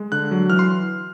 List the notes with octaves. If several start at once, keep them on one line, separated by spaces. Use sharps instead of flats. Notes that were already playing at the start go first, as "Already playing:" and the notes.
Already playing: G#3
D3 F#6
F#3
E3 F6
C6